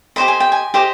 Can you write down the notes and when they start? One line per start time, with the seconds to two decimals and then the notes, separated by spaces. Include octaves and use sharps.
0.16 G4 C5 D#5 B5
0.28 G#5
0.40 G5
0.52 G#5
0.74 G4 C5 D#5